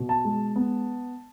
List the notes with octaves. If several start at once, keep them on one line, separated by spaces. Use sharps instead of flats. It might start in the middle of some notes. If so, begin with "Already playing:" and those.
Already playing: B2
A5
G#3
B3